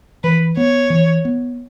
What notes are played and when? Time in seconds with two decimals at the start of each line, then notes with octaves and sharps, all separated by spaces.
0.23 E3 B4
0.56 B3 C#5
0.90 E3
1.25 B3